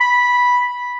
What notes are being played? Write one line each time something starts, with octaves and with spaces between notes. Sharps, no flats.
B5